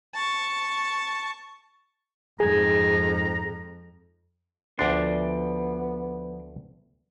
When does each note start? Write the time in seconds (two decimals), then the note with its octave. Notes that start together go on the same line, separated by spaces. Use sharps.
0.15 A5 C#6
2.40 F2 G#2 G#4 A#5 G#6
4.79 D2 F3 B3 D4 D5 C6